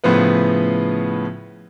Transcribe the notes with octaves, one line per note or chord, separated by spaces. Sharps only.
A2 C#3 F3 B3 B4